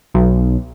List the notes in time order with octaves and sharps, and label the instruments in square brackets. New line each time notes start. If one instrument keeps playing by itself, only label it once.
[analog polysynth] B1